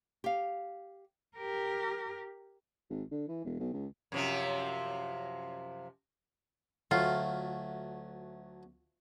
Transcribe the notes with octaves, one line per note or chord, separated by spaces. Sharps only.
G4 F5
G4 A#4
G#1
D3
E3
E1
B1
C#2
F#2 C3 F3
D2 F#3 A3 F4